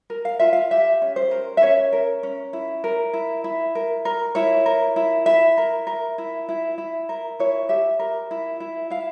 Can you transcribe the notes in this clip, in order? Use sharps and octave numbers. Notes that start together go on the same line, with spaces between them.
A#4
F5
F4 E5
F5
G4 E5
C#4
C5
A#4
E5
C#4 C#5
A#4
C#4
E4
A#4
E4
E4
A#4
A#4
E4 C#5
A#4
E4
E4 E5
A#4
A#4
E4
E4
E4
A#4
E4 C#5
G4 E5
A#4
E4
E4
E4 F5